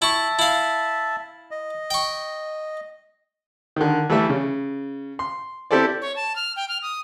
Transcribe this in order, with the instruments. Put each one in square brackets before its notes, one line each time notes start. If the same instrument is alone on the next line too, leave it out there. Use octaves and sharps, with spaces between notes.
[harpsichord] E4 C#6 [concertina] E5 A5
[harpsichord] E4 F5
[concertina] D#5
[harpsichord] G5 C#6
[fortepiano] D3 D#3
E3 G3 A3 A4 E5
C#3
C6
C4 E4 G4 A4 C5 D5
[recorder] C#5
A5
F6
G5
F6
D#6